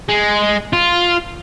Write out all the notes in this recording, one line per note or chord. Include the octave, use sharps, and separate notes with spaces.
G#3
F4